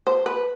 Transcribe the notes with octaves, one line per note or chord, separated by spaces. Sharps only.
C5
B4